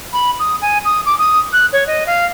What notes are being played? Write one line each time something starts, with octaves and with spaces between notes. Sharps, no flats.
B5
D#6
G#5
D#6
D6
D#6
F#6
C#5
D#5
F5